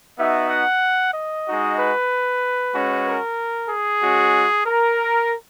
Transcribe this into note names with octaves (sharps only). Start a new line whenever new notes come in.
B3 D#4 F#4 E5
F#5
D#5
G#3 D#4 F#4
B4
G#3 C#4 F#4
A#4
G#4
G#3 C#4 F#4
A#4